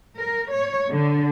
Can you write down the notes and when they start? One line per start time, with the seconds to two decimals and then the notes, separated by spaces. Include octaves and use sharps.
0.17 A#4
0.52 C#5
0.90 D3